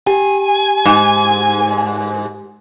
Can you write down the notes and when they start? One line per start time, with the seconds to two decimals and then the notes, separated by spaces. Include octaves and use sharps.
0.07 G4 G#5
0.85 G#2